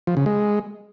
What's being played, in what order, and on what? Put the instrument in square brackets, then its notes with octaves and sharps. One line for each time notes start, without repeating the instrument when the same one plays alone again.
[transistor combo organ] F3
C#3
G#3